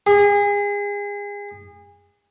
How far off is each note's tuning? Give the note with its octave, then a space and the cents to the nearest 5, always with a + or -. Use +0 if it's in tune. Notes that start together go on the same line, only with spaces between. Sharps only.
G#4 -30